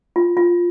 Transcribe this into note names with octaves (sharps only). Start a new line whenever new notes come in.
F4
F4